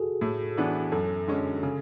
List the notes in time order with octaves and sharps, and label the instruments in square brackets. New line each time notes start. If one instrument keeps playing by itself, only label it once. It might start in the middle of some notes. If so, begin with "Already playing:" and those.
Already playing: [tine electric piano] F#4 G#4 A4
[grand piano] A2
E3 B3 D4
[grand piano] F#2 [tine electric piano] A4
[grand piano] D3 G#3 C#4
C#3